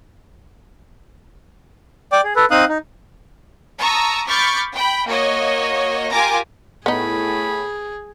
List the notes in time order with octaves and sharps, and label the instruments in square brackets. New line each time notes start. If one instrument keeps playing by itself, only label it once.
[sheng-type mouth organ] D5 G5 D6
G#4
A4 B4
C4 D#4 F5 D#6 F#6
D#4
[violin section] A5 A#5 C#6 D#6 E6
B5 C#6 D6 F6 G6 A6
G5 B5
A#3 F#4 C#5 D#5
F4 G4 A#4 G#5 A#5 D6
[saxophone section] A2 [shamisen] B3 D#4 [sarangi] G#4 [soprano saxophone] B5